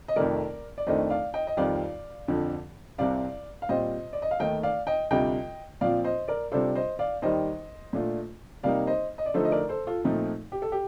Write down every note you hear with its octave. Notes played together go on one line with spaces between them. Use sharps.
D#5
F2 C3 D#3 A3 A#4 D5
D5
F2 D#3 A3 D4 C5 D#5
D5 F5
D#5 G5
D#5
F2 D#3 G3 C4 F4 D5 F5
F2 D3 F3
C2 C3 G3 C4 D5 F5
F5
A#2 G3 C4 F4 C5 D#5
D5
D#5
F5
D#2 D#3 A3 D#5 G5
D5 F5
D#5 G5
D2 C3 G3 D4 F4 D#5 G5
A#2 F3 C4 F4 D5 F5
C5 D#5
A#4 D5
C3 G3 D4 F4 A4 C5
C5 D#5
D5 F5
D#2 D#3 G3 C5 D#5
A#2 A3 D4 F4
C3 G3 A#3 D#4 D5 F5
C5 D#5
D#5
D5
D3 F3 A3 D#4 A4 C5
D#5
A#4 D5
A4 C5
F4 A4
A#2 F3 A3 C4 D#4
G4
A4
G4